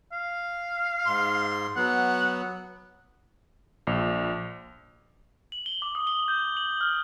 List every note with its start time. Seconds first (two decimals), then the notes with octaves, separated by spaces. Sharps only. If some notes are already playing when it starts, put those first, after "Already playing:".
0.12 F5
1.06 G#2 C6
1.76 F#3 B3 F#5
3.87 A#1
5.52 F#7
5.66 G7
5.82 D6
5.95 D#6
6.07 G7
6.28 G6
6.57 F#7
6.81 F6